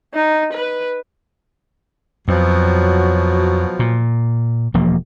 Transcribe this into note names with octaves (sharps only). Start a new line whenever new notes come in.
D#4
B4
F2 B2 F3 F#3
A#2
E1 F3 A#3